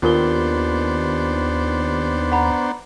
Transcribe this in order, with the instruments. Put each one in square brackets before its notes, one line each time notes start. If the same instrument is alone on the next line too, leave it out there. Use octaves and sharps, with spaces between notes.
[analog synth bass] D#2 [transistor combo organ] B3 D4 C5 [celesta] F4 A#4 G7
[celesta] F#5 A#5 B5